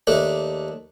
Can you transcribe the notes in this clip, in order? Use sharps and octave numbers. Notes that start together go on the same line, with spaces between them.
D#2 A3 D4